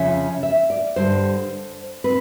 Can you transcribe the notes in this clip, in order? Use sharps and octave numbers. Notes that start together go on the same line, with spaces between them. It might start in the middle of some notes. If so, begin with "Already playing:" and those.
Already playing: F2 C#3 F3 C#4 E5
E5
D5
G2 D3 G3 C5
C4 B4